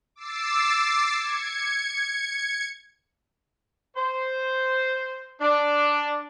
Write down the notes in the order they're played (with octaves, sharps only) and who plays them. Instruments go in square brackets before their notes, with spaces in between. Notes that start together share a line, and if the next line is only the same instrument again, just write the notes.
[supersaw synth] D6 E6 A6 C7
G#6 C#7
[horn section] C5
D4